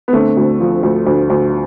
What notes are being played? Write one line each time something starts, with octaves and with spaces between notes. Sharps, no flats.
B3
D3 A3 C4
D2
F3
D2
D2
D2